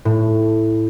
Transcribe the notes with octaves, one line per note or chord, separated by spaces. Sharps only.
A2